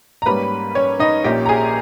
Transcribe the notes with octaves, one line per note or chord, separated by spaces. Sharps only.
A#5
G#2 G3 A#3 C#4 B4 B5
C#4 C#5
D#4 D#5
A#1 A#2 A#3 C#4 G4 G5
A#5
G#4 G#5